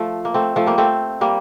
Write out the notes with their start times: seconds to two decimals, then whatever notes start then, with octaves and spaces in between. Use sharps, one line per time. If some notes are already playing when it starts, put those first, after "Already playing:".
Already playing: F3 A3
0.25 A#3
0.34 A3 C4
0.56 F3 A3
0.66 G3 A#3
0.78 A3 C4
1.21 G3 A#3